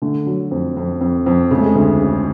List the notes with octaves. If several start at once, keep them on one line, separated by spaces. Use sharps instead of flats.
D3 A3
F#3
F2
F2
F2
F2
C#3 G#3
A3
G#3
D2
C#3